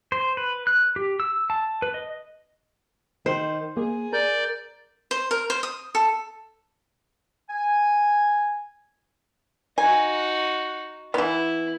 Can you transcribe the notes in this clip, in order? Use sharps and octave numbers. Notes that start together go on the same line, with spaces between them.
C5
B4
F#6
G4
E6
A5
B4
D#5
D#3 C5
A#3 G#4
A#4 D5 G6
C5
A#4
C5
D#6
A4
G#5
D#4 F#4 G#5
E3 B3 E4